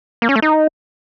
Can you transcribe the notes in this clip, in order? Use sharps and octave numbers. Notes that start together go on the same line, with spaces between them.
A#3
C#4
A3
D#4